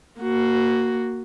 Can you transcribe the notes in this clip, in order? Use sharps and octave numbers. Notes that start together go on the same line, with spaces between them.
A#3 F#4